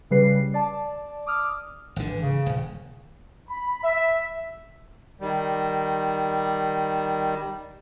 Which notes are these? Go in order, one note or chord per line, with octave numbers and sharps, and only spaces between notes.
C#3 G3 B4 C7
D5 A5
D6 D#6 F6
G#1 D3
E3
C#3
D#1
B5
E5
D#3 G3